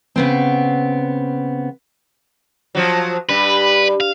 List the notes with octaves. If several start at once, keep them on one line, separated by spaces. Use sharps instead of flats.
C#3 B3 C4
F3 F#3
G2 B4
F5